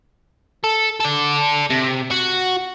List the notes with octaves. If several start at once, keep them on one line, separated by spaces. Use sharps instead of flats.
A4
A4 D5
C3
F#4